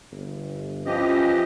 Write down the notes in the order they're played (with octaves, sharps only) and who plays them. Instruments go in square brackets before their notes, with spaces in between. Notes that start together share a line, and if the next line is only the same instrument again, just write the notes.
[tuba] G1
[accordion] E3 G4 D#5 [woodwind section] F3 [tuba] C#4